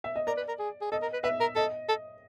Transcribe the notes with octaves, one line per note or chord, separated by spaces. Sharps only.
E5
D#5
A#4 D5
B4
A#4
G#4
G#4
A4 D#5
A#4
B4
B4 E5
A#4
A4 D#5
A4